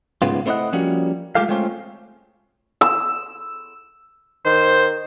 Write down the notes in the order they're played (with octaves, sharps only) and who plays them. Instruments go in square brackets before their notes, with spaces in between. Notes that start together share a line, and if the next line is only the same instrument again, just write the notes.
[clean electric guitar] G#2 C#3 B3 F4
A3 C4 E4 C#5 D#5 F#5
F3 G3 A#3 C#4 F#4
G#3 A3 F4 G4 A4 F5
G#3 A3 C4 C#4 F4
[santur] E6
[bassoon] D#3 [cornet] C5